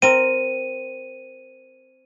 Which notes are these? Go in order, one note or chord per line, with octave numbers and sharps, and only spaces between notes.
C4 A#4 D#7